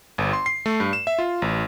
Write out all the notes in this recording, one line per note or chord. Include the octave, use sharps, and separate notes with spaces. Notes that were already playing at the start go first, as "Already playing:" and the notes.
G1
C6
C7
A3
G2
E7
E5
F4
A1